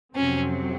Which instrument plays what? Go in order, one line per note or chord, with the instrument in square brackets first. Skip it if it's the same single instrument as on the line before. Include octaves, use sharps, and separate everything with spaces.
[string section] F2 C3 F#3 C4 [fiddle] C#4